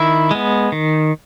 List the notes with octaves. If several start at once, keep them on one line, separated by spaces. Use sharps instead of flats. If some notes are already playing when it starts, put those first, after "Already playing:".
Already playing: D#3 E4
G#3 B3
D#3